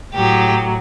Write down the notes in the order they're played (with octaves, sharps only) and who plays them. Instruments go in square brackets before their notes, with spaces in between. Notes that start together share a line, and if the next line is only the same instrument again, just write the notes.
[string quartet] A2 F#3 G4